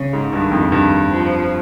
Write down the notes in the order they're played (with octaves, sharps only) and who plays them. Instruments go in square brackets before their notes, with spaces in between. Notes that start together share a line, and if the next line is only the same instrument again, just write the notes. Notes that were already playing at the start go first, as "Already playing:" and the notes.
Already playing: [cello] C#3
[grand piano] G#2
[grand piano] G2 [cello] D#3
[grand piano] F2
[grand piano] G2 [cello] D#3
[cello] F3